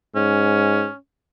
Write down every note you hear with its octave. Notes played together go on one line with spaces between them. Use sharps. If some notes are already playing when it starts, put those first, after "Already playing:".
G#2 C#4